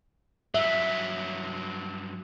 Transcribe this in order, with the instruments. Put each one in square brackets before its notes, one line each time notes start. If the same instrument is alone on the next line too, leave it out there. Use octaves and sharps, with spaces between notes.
[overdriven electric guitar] G2 F#3 [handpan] E5